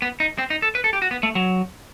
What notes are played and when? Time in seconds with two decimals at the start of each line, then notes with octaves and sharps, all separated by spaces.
0.02 B3
0.20 D#4
0.38 C4
0.50 D#4
0.62 A4
0.75 B4
0.84 A4
0.93 G4
1.02 F#4
1.11 B3
1.23 A3
1.35 F#3